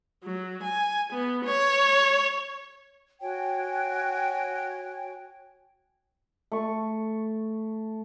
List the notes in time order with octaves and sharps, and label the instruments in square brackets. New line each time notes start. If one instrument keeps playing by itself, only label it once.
[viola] F#3
G#5
B3
C#5
[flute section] F#4 C#5 G5 G#5
[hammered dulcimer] A3 C#6